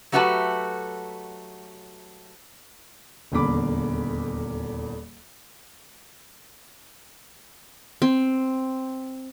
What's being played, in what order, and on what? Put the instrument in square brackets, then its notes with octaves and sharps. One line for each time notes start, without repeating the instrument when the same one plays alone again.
[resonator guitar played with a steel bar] F#3 A3 F#4 G4 B4 A5
[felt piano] D#1 E2 D3 A#3 B5 D6
[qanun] C4